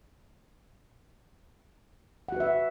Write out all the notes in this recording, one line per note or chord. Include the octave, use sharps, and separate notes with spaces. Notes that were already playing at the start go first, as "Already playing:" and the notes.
F#4 B4 E5 F#5